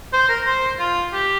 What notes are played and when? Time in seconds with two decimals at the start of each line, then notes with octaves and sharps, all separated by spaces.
0.13 C5
0.29 A#4
0.46 C5
0.79 F4
1.13 G4